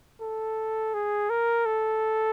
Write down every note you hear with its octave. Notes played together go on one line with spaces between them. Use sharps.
A4
G#4
A#4
A4